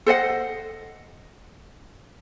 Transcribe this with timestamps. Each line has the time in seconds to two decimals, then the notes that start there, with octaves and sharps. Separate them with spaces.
0.06 A4 C5 D#5 F#5